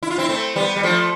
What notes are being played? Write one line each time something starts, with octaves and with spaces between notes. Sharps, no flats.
E4
F4
C4 E4
A3 C4
G3 B3
G3
F3 A3